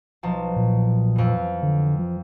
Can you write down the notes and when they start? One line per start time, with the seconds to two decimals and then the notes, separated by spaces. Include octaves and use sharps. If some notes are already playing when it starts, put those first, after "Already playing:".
0.23 B1 F3 A5
0.56 A#2
1.16 F2 E3
1.63 D3
1.99 F3